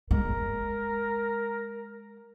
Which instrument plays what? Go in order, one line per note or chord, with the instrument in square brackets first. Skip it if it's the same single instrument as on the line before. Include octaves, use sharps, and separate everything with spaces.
[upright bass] G#3 [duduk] A#4